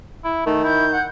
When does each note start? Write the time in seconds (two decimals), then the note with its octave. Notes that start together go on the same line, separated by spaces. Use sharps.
0.24 E4
0.46 D#3 A3
0.64 E4 G6
0.93 F#5